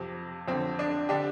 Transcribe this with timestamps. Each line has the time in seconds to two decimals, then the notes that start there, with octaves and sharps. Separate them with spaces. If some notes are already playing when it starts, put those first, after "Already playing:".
Already playing: F2 C3
0.48 F2 D3 C4
0.79 D4
1.09 D3 D4 G4